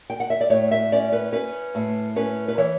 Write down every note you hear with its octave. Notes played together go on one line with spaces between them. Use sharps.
G5
F#5
E5
D5
A2 C#5
E5
C#4 D5
B4
C#4 B4
A2
C#4 B4
B4
E3 C#5